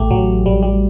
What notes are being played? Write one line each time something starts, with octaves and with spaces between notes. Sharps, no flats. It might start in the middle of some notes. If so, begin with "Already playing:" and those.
Already playing: A1 A3 G4
A1 F#3
A1 G3
G3